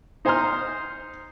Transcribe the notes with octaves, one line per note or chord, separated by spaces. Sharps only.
D#4 C5 G#5 A#5 C6 F6